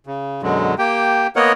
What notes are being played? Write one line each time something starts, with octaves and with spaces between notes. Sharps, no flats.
C#3
F#2 B2 D3 F#3 G#3
A#3 G4 G5
A#3 B3 A#4 C#5 D#5 F#5